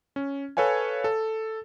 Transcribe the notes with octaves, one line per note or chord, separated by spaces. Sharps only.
C#4
A4 B4 C#5 F5 G#5
A4